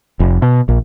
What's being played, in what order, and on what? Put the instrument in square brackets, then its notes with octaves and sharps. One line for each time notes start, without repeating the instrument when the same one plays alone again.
[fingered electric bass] F1
B2
A#1